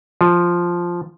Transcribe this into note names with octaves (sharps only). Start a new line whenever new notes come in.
F3